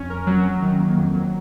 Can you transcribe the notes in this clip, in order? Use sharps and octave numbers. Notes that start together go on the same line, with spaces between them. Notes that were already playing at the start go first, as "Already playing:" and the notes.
Already playing: F2 C#4
A#4
F#3
F#3
D#3
A#3
F2
F#3